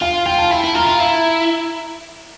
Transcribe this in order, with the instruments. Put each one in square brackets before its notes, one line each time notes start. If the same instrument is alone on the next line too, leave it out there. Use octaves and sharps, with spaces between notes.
[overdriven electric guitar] F4 [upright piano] F5
[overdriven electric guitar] F4 [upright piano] G5
[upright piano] A5
[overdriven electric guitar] E4 [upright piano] A5
[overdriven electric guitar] E4
[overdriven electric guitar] F4 [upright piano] A#5
[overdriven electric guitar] F4 [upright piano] A#5
[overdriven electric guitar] E4